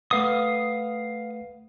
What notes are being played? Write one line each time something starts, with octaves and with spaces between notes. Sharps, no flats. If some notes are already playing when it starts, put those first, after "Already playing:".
A3 B4 F5 F#5 D#6